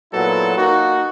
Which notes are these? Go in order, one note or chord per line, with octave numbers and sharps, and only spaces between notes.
A#2 F#3 B3 E4 A4
A#3 D#4 F#4